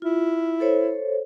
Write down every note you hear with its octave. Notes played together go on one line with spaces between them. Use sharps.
E4 F4
A4 C5 C#5